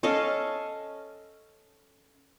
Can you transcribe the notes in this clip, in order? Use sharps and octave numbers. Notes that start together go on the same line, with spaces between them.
C#4 A4 D#5 F5